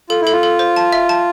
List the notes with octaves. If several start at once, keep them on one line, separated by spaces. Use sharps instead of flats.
F4 A4
E4
A4
F4
A4
C5
A5
E5
A5